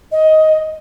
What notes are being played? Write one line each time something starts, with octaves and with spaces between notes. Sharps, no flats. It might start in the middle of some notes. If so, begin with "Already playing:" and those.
D#5